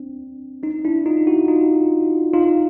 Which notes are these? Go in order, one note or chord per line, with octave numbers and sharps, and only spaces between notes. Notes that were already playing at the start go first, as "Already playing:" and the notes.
Already playing: C4 D4
C#4 D#4
D4 E4
D#4 F4
E4 F#4
D#4 F4
D#4 F4